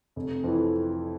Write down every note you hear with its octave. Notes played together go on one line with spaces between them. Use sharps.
F1
F2 E3